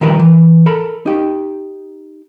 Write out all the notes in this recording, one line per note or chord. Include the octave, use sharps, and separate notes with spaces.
D#3 F3 G3 E4 A#4 B4
E3
A4 A#4 B5
D#4 G4